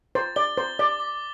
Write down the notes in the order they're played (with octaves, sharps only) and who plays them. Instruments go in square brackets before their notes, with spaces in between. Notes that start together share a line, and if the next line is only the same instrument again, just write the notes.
[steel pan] C5 [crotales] A6
[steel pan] D5 [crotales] G7
[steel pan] C5 [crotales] A6
[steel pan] D5 [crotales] D6
[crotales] D6